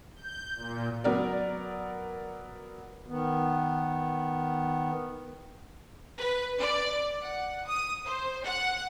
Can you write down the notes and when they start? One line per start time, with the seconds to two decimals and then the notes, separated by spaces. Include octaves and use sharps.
0.15 G6
0.56 A#2
1.04 F#3 B3 A#4 D5
3.07 D#3 B3
6.19 B4
6.60 D5
7.22 F#5
7.66 D#6
8.05 C5
8.44 F#5